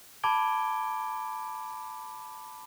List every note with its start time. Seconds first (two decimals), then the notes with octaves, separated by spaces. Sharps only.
0.23 A5 B5 D6 G#6 D7 G7